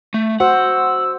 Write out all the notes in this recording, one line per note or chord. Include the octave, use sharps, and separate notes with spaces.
A3
F#4 C5 F#5 E6